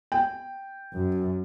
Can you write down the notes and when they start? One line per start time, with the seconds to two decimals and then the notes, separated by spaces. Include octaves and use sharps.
0.12 G5
0.93 F#2